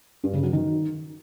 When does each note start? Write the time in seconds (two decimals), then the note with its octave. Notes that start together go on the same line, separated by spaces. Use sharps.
0.24 G2
0.33 C#3
0.43 F#3
0.53 D#3